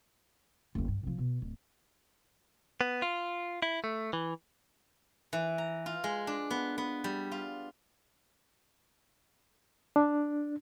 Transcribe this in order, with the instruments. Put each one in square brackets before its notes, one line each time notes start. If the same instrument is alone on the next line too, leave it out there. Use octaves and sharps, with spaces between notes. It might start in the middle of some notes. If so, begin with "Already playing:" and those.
[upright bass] F#1 E2
G2
C3 F3
B2
D1
[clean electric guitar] B3
F4
E4
A3
E3
[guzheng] E3
A#5
F4
G#3
D4
B3
B3
G3
F4
[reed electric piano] D4